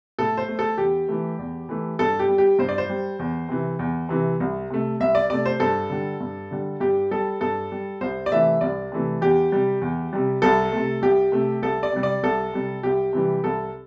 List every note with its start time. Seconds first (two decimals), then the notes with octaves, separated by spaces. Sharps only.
0.18 A2 A4
0.37 C5
0.48 A3
0.59 A4
0.78 E2 G4
1.08 E3 A3
1.39 E2
1.69 E3 A3
1.99 G2 A4
2.19 G4
2.29 G3
2.38 G4
2.59 G2 C5
2.69 D5
2.78 C5
2.90 G3
3.19 E2
3.49 C3 E3
3.79 E2
4.09 C3 E3
4.40 C2
4.70 C3 A3
5.00 C2 E5
5.15 D5
5.30 C3 A3 D5
5.46 C5
5.60 G2 A4
5.90 D3 G3
6.20 G2
6.51 D3 G3
6.80 G2 G4
7.11 G3 A4
7.41 G2 A4
7.72 G3
8.01 C2 C5
8.26 D5
8.32 C3 E3 A3 E5
8.61 C2 D5
8.92 C3 E3 A3
9.21 E2 G4
9.52 C3 G3
9.81 E2
10.13 C3 G3
10.42 C2 A4
10.73 C3 A3
11.02 C2 G4
11.32 C3 A3
11.62 C2 A4
11.83 D5
11.92 C3 G3
12.03 D5
12.23 C2 A4
12.54 C3 G3
12.83 C2 G4
13.13 C3 E3 G3
13.44 C2 A4